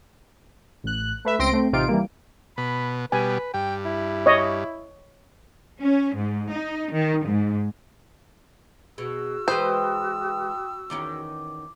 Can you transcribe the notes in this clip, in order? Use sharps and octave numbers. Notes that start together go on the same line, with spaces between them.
A1 F#6
A3 B4 E5
C#2 C4 C6 A#6 D7
A3 C4
A1 C3 D#4 F4 G4 D7
E3 G3 A#3
B2 B5
B2 G3 B4 G#5
G2 G5
E4
C#5 D#5
C#4
G#2
D#4
D#3
G#2
B2 F#4 G#4 E6
E3 G#3 B4 C5 G5 B5 D#6
E2 D#3 C#4 D6